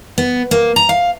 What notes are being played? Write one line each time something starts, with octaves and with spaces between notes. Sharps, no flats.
B3
A#3
A#5
F5